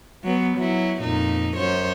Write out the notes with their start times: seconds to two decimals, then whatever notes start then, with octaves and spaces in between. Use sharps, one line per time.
0.24 F#3 B3
0.57 F#3 E4
1.01 F2 A#2 D#4
1.56 F#2 C5 C#5